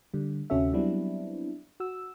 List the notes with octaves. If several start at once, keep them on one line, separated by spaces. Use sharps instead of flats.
D3 G3
D2 C3 C#4 F#4 A4 E5
F#3 G3 B3 C4 D4 E4
F#4 E6